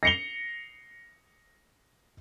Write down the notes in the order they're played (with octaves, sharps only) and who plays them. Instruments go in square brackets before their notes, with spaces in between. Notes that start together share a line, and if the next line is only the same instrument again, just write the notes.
[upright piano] A#6 C7 C#7 F7 G7